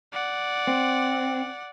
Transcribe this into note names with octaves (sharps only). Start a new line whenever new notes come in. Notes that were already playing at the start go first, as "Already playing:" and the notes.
D5 F#5
C4